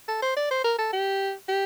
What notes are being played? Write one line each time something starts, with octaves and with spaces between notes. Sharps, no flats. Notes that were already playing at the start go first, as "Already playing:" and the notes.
A4
C5
D5
C5
A#4
A4
G4
G4